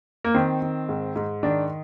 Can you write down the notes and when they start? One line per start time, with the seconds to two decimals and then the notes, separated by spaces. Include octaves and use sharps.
0.24 A#3
0.34 D#3 C4
0.62 D#3
0.89 G#2
1.16 G#2
1.43 D#3 D4